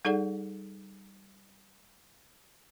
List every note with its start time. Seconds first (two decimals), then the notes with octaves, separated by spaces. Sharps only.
0.05 G3 D#4 G#4 A4 D5 F#5